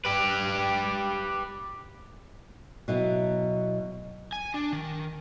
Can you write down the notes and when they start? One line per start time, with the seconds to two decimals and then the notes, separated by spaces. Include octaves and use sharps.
0.05 G4 B4
2.88 B2 F#3 E4
4.33 G#5
4.54 D4
4.73 D#3